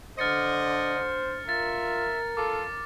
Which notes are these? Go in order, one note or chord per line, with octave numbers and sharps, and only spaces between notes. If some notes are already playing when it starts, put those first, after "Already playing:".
D3 C5 D#5 F6 A6 C#7
F4 A#4 E5 A6
F4 A4 D6